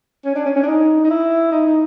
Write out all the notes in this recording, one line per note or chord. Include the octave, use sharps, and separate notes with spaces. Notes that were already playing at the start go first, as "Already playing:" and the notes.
C#4
D4
C#4
C#4
D4
D#4
D#4
E4
D#4
D#4